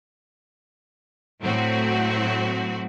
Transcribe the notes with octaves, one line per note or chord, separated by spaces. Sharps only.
A2 F#3 C4 F#4